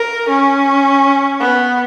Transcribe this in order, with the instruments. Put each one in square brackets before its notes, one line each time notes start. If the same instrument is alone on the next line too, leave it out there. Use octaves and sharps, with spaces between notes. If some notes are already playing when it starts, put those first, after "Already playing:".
Already playing: [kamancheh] A#4
C#4
B3